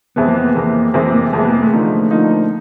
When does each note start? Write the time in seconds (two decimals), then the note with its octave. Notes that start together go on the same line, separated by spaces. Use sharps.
0.16 F2 C3 E3 G#3 B3
0.28 A#3
0.36 B3
0.55 F2 C3 E3 G#3 A#3
0.94 F2 C3 E3 G#3 A#3
1.13 A#3
1.33 F2 C3 E3 G#3 A#3
1.43 B3
1.53 A#3
1.62 A3
1.73 D3 F3 A#3 D#4
2.11 D3 F3 A#3 D#4